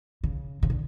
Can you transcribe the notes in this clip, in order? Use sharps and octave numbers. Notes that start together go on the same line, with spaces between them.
C#3
C#3
D3